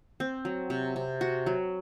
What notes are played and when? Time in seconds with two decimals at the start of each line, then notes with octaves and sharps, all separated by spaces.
0.20 C4
0.45 F#3
0.70 C3
0.96 C3
1.21 F#4
1.46 F#3